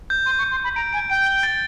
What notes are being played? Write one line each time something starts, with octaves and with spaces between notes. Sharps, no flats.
G6
C6 D#7
C#6
G6
C6
B5 G6
A#5 D7
G#5 D7
G5 D7
G7
A6